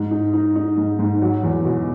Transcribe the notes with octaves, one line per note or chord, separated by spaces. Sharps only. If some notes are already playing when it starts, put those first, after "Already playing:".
Already playing: G#2
D#4
D#4
D#4
G#2
G#2
F#3
E2
B2